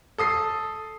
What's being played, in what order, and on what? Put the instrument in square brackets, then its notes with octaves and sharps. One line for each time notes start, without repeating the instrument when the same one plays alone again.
[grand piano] A4 D#6 C7